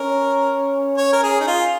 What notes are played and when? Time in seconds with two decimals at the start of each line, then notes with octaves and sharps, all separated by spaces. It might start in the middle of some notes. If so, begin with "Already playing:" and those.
Already playing: C#4 A#4
0.97 C#5
1.13 A#4
1.23 G#4
1.40 D#4
1.47 F4